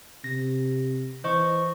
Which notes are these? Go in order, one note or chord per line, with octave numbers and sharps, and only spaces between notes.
C3 A#6
E3 C5 D#5 C#6